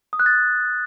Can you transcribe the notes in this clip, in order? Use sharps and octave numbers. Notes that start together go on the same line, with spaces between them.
D#6
F#6
A6